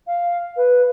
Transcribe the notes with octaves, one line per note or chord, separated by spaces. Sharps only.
F5
B4